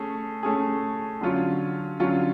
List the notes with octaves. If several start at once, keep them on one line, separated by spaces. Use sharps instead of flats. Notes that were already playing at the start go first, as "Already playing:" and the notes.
Already playing: A3 C#4 G#4
A3 C#4 G#4
D3 F#3 C#4 F4
D3 F#3 C#4 F4